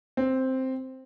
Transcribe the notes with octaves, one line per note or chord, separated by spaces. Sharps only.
C4